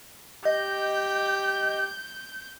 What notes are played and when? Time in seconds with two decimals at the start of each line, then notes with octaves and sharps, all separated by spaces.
0.45 G4 D#5 G6